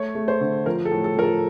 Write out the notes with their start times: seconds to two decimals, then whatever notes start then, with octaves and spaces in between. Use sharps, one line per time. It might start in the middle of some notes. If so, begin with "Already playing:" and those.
Already playing: A3 C#5
0.15 A3
0.28 C5
0.41 D3
0.66 F3 A#4
0.85 A4
0.91 A2
1.04 A4
1.17 F3 A#4
1.23 A4